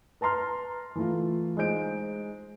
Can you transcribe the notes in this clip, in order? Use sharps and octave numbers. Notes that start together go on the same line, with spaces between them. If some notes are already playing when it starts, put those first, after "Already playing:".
B4 A5 A#5 C6 F6
E3 A3 F4
G#3 D#4 C5 G6 D7